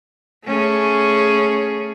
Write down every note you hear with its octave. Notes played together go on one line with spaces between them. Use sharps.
A3 C#4 G#4